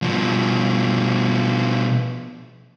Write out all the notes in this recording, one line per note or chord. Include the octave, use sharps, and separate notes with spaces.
B2 F3